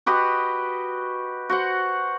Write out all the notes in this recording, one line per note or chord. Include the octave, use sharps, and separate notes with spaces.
F#4 G4 B4 D#5
F#4 C5 F#5